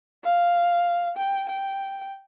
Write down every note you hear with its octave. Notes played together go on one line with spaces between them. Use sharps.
F5
G5
G5